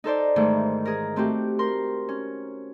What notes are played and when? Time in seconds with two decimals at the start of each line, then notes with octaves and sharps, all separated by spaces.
0.04 D#4 A4 C5 D5
0.36 G#2 D#3 E3 A3
0.85 G#4 A#4
1.16 A3 C4 F#4 G4
1.59 A#4 C6
2.09 C#4